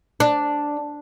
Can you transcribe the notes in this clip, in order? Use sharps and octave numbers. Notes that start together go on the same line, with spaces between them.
D4